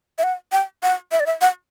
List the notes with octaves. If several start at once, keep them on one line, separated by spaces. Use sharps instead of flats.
E5
F#5
G5
F#5
E5
D5
E5
F#5